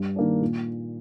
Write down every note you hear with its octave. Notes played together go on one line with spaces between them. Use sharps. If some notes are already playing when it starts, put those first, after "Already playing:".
Already playing: G2
D#3 A#3 D4
A#2